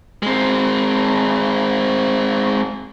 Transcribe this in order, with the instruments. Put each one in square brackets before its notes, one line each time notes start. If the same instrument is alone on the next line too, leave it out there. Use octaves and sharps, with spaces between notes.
[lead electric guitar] G#3 C4